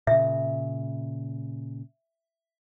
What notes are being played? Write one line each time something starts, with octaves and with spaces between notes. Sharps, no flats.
A#2 C#3 E5